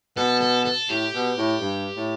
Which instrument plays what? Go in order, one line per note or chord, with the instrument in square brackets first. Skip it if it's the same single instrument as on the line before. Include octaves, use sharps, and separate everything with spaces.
[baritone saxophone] B2 [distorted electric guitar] A4
[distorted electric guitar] A4
A4
[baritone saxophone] A2 [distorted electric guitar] G4
[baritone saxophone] B2
A2
G2
A2